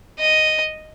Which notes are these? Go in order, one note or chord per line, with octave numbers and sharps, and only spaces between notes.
D#5